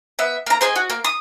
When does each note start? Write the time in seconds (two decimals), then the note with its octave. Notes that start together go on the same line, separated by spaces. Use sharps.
0.19 B3 E5
0.46 A#3 A#5
0.61 C4 G#4 D#5 G#5
0.76 F#4
0.90 A#3
1.04 D#6